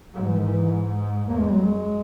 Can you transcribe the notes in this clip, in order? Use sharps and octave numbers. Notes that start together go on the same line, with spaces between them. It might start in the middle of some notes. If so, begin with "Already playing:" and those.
G#2 F#3
E3
D#3
E3
E2 A#3
G#3
F#2 F#3
G#3